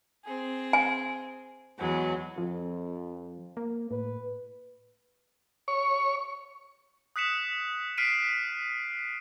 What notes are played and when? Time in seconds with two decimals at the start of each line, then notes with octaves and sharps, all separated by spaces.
0.24 C4 G#4
0.73 G#5
1.78 E2 F#3 G#3
2.38 F2 F3
3.57 A#3
3.91 A2 B4
5.68 C#5 C#6
7.16 D#6 F#6 B6 C#7 E7
7.98 F6 B6 C7 D7 D#7